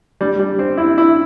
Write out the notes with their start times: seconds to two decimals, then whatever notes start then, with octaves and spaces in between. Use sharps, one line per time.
0.21 G3
0.40 G3
0.59 C4
0.77 E4
0.98 E4